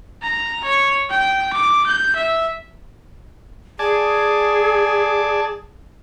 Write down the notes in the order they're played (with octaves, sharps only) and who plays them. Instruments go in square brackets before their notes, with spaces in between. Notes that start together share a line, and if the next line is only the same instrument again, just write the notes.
[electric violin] A#5
C#5
G5
D6
G6
E5
[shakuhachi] G#4 [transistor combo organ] D5 G#5 A5